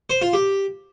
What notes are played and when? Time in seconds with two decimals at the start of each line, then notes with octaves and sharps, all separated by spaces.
0.10 C5
0.21 F4
0.33 G4